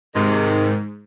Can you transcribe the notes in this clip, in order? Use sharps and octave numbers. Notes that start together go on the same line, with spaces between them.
G#2 C3 D#3